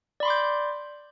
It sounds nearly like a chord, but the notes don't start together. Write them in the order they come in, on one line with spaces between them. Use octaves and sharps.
D5 B5 C6 D6 G6